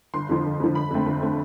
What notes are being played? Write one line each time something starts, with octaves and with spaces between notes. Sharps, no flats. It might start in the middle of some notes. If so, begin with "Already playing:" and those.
G1 C6
F2 D3 F3
G1
F2 D3 F3
G1 B5
F2 D3 A3 C4
G1
D3 A3 C4